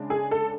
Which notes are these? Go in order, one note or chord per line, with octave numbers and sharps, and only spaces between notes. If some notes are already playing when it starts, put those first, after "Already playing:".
Already playing: C#3 G#3 D4
G#4
A4